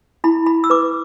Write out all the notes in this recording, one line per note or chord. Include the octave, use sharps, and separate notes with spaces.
E4 B5
B5
E6
B4 D6